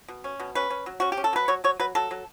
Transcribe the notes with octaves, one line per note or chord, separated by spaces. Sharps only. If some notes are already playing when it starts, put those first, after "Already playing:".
B2
C#4
B2
C#4 B4
C#4
F#3
C#4 F#4
G4
C#4
A4
F#3 B4
F#3 C#5
F#3 C#5
F#3 B4
F#3 A4
F#3